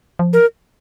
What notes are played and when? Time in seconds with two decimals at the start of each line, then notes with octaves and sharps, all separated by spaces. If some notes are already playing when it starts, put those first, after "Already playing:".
0.19 F3
0.33 A#4